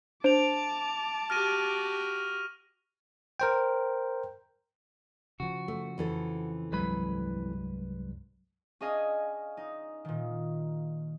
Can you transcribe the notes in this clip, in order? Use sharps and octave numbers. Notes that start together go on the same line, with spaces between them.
D4 C5 A5 D6 D7 F7
F#4 G4 F6 A#6 D#7
A#4 C5 G5
C#3 F3 F#4
A3
F2 E3 A4
C2 G2 F#3 G#3 B4 B5
C#4 D4 G#4 D#5 F5 G#5
D#4
A#2 D#3